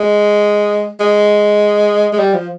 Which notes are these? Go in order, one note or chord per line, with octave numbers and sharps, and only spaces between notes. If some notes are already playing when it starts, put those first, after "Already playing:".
Already playing: G#3
G#3
G#3
G3
F3